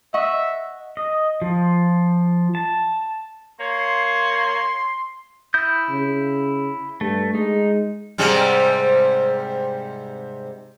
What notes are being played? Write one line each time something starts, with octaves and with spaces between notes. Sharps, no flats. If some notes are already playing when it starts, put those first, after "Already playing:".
D#5 E5 F#5 C#6
D#5
F3
A5
A#3 C#5 C6
E4 D#6 G6
C#3
G2 A3
G#3 D#4
G#2 C3 G3